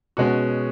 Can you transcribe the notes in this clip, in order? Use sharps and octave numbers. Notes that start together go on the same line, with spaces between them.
B2 G#3 C#4 F#4